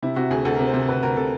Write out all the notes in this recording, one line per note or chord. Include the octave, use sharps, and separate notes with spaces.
C3 E4
C3 F#4
D2 G#4
D2 A4
C3 A#4
C5
C3
D2 B4
D2 A#4
C3 A4